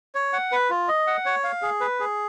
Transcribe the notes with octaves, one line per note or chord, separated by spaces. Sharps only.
C#5
F#5
B4
F4
D#5
F#5
C#5
F5
G#4
B4
G#4